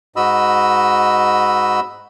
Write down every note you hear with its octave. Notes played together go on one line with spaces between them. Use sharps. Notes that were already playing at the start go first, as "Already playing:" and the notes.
G#2 F#4 D#5 B5 E6